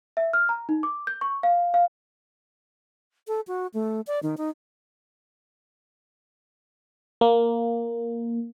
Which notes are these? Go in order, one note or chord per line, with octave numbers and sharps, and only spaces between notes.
E5
F6
A#5
D#4
D6
G6
C#6
F5
F5
A4
F#4
A3
D5
D#3
D#4
A#3